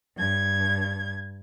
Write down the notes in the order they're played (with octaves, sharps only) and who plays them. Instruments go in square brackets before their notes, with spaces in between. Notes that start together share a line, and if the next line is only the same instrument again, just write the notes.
[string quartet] G2 G#6